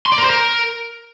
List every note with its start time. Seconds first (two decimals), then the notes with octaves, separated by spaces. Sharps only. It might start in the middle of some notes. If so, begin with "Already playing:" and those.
0.06 C6
0.12 D5
0.18 A#4
0.24 C5
0.30 A#4